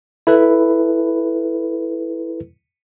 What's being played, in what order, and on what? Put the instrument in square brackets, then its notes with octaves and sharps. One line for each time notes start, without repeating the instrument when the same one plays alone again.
[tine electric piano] E4 A4 B4